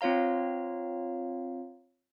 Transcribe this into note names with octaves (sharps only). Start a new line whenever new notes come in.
C4 F4 C#5 F5 A#5